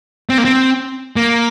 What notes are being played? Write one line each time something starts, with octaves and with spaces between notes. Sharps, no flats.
C4
A#3
C4
A#3